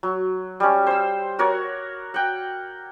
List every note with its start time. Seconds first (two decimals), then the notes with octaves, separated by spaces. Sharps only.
0.03 F#3
0.60 G3 C#4
0.87 C5 E6
1.39 F#4 A#4 C#5 D5
2.14 F#5 G5